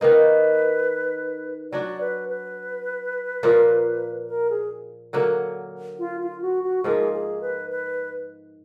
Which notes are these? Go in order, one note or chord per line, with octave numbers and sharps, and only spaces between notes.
D#3 A#3 D#4 B4
F#3 D4 F#4 D5
B4
B4
A#2 F3 A#3
A#4
G#4
D3 F#3 A#3
F4
F4
F#4
F#4
G#2 F3 A#3 G#4
G#4
B4
B4